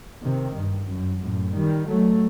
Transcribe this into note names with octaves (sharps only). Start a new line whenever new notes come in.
C3 D#3
G2
F#2
F#2 A2
D#3 G3
F#3 A3